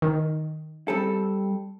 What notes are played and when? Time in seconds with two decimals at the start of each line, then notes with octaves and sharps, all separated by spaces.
0.02 D#3
0.88 G3 C4 A4